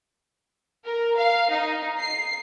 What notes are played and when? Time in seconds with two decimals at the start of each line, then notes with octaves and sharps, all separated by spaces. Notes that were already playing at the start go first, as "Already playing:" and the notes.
0.85 A#4
1.16 F5
1.50 D#4
1.98 C7